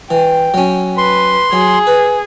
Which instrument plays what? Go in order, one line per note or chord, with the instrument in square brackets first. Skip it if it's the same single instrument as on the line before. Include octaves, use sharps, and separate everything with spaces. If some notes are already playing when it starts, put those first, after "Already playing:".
[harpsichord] E3 [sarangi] G5
[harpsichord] F#3 C#4
[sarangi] B4 [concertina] C6
[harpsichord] F#3 [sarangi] G#4
[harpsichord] B4